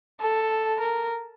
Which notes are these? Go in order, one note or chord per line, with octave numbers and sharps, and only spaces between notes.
A4
A#4